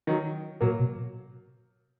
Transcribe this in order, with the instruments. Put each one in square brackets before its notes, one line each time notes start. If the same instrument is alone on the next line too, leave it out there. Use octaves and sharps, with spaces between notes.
[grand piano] D#3 F#3
[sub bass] A#2 [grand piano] F#3 A#3
[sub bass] B2